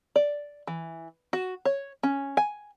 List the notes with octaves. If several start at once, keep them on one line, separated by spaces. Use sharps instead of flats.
D5
E3
F#4
C#5
C#4
G#5